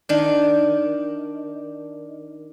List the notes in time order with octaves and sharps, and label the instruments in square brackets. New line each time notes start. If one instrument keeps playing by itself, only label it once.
[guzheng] D#3 D4